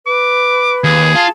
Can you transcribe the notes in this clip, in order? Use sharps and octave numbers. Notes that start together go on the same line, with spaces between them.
B4 D6
D#2 G#4
F4 A5